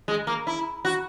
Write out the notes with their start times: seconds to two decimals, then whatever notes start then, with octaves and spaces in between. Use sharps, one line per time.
0.08 G#3
0.27 A#3
0.47 E4
0.85 F#4